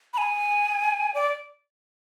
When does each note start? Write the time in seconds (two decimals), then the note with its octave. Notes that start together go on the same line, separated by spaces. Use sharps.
0.14 B5
0.18 G#5
1.14 D5